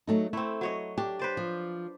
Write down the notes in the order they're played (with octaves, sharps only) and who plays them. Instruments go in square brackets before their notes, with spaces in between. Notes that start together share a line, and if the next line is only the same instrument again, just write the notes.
[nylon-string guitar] F#3 A3 D#4
[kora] A3 C4 [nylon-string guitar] E4
[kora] F#3 C#5 D#5
[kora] D4 [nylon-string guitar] G4
[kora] B4 C5 D5
[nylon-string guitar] F3